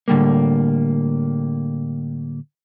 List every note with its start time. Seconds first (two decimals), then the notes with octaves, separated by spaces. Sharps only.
0.08 A2 D3 G3 A#3